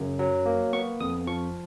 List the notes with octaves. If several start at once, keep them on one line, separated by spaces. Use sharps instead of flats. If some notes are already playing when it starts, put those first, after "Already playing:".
Already playing: F#2 C#3
F#3
A#3
B3 C#6
F2 D#6
F3 C#6